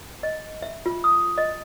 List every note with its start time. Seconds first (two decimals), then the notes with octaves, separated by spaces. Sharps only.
0.23 D#5
0.62 E5
0.86 F4
1.04 D#6
1.38 D#5